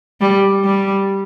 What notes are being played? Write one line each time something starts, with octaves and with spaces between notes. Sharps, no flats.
G3
G3